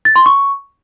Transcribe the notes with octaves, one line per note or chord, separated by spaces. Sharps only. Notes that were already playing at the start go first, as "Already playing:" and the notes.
A6
C6
C#6